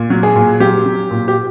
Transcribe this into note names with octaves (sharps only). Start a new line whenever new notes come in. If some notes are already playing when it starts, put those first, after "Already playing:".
Already playing: A#2
F#3
G#4
A#2
F#3 G4
F#3
A#2
G4